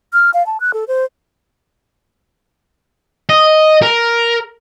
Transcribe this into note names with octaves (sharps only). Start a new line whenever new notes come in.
F6
F5
A5
F#6
A4
C5
D#5
A#4